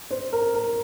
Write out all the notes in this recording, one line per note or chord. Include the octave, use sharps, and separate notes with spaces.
C5
A#4
A#4